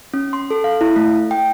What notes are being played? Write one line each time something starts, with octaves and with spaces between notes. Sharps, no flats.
C#4
C6
A4
F5
E4
A3
G5